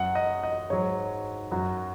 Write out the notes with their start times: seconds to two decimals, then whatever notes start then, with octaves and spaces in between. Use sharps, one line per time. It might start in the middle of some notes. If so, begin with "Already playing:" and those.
Already playing: F#2 F#3 F#5
0.15 D#5
0.43 D#5
0.70 G#2 F#3 C#5
1.51 F#2 F#3 F#4